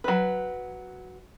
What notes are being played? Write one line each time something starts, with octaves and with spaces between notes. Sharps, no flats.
F#3 B4